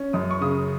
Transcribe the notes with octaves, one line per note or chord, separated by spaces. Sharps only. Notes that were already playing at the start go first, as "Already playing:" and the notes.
Already playing: C#4
F#2 D#6
C#6
C#3 D#6